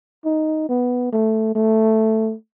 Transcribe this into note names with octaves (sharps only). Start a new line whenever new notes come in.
D#4
B3
A3
A3